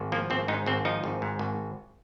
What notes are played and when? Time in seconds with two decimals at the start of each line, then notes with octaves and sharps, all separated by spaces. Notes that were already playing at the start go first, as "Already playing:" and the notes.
Already playing: G#1
0.12 F3 A#3
0.30 G#1 C4
0.48 G#2 D#4
0.66 G#1 C4
0.85 F3 D#4
1.04 G#1
1.22 G#2
1.39 G#1